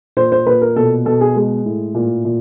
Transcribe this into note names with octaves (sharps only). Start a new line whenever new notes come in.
A#2 C5
C5
A#2 B4
A#4
B2 A4
B2 A4
G#4
G#3
A2
A#2
A#2